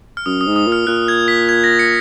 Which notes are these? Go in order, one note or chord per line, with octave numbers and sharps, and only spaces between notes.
F6
F#2 D#6
D#6
G#2
D#6
A#2
F6
A#2 F#6
G#6
B6
G#6
A#6
C#7